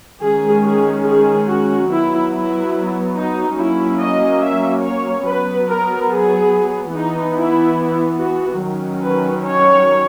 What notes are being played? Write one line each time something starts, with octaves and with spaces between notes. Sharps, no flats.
D#3 G#3 C#4 G#4
G#4
G#4
F#4
F#3 B3 E4
E4
D#4
F#3 A#3 C#4 E4
D#5
E5
C#5
F#3 B3 B4
A#4
G#4
E3 B3 D#4
E4
F#4
D#3 F#3 C#4
B4
C#5